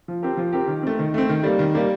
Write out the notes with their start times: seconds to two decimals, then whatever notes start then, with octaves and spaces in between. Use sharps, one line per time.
0.08 F3
0.23 C4 G4 A#4
0.37 F3
0.53 C4 G4 A#4
0.68 D#3
0.83 A3 C4
0.99 D#3
1.14 A3 C4
1.29 D#3
1.43 G3 A#3
1.59 D#3
1.75 G3 A#3